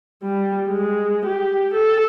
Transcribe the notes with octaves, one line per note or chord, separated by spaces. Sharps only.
G3
G#3
G4
A4